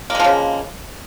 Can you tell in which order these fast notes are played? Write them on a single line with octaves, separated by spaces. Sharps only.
A#3 G#3 F3 C#3